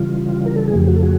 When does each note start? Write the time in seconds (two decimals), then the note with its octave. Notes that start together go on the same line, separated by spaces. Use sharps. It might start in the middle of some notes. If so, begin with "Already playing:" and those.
Already playing: C#3 E3 G3 F4
0.46 A#4
0.56 A4
0.68 G#4
0.73 F2 C#3 F3 A3 G4
0.87 F#4
0.96 A4
1.02 F#4 G#4